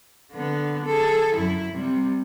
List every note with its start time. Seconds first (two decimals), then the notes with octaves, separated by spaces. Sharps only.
0.33 D3 B3
0.86 G#4 A4
1.35 F#2 E4
1.72 C3 G3